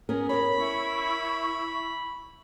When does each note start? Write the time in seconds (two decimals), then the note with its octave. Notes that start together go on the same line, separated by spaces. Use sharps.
0.09 B3 C#4 G#4 A#4
0.29 A#4 C#5 B5
0.56 E4 C#6